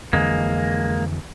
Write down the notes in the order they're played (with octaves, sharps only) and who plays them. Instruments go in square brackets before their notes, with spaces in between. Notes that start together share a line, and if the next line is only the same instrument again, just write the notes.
[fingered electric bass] F2 D3 E3 [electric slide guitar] G#3 A#3